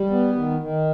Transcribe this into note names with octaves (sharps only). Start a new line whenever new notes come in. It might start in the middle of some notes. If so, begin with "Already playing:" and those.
Already playing: G3
B3
D#3
D#3